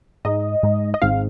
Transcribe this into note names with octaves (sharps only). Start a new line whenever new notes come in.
G#2 G#3 D#4 D#5
G#2 G#3 D#4
D#5
G#1 G#2 G#3 C4 D#4 F5